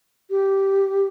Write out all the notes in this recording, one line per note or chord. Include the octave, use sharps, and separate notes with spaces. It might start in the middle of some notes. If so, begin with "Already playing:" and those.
G4